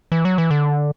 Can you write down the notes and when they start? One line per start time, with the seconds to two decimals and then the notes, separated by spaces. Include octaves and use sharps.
0.12 E3
0.25 F#3
0.38 E3
0.51 D3